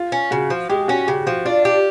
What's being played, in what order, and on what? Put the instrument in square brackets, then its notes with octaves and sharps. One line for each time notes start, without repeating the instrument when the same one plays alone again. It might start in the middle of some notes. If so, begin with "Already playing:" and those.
Already playing: [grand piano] F4
[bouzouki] C#4
[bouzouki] C#3 [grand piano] F#4
[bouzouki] F3
[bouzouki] G#3 [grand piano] G4
[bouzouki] C#4 [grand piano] F#4
[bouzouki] C#3 [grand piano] G4
[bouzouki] F3 [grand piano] F#4
[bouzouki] D4 [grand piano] F4
[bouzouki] G4